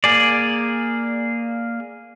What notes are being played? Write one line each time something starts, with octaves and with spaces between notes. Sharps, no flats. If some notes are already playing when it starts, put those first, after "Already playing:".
A#3 G#4 D5